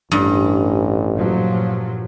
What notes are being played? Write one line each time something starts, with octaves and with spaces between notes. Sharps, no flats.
A1 G2
A#2 F3 F#3